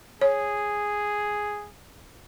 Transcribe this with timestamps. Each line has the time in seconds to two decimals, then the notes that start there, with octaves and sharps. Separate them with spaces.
0.21 G#4 C#5